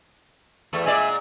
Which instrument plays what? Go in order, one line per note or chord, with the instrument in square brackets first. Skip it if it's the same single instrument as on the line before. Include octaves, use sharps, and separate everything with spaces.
[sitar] E2 A3
[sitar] A#2 G#3 D5 [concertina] E5 G#5